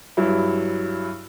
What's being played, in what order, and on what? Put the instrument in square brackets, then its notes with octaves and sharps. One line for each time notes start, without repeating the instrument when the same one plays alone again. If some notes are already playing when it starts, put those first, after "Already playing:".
[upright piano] G2 F#3 E4